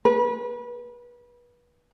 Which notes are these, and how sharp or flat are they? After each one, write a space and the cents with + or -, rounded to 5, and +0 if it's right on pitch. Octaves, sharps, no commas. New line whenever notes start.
B4 -30